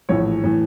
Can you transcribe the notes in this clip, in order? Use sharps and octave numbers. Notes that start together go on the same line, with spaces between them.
A#1 A2 E3 C#5
A2 E3